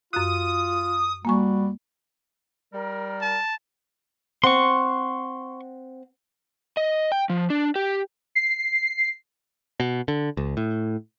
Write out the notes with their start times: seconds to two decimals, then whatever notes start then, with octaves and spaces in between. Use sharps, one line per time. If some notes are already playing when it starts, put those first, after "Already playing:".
0.13 F#2 F4 D#6 F#6
1.25 G3 A#3 F#4 G#5 C#6
2.74 G3 A#4
3.21 A5
4.44 C4 F#5 C6 C#6
6.77 D#5
7.12 G5
7.29 F3
7.50 D4
7.76 G4
8.35 C7
9.80 B2
10.08 D3
10.37 C#2
10.57 A2